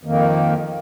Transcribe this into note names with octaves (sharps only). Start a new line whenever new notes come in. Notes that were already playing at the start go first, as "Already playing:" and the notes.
F2 D#3 A#3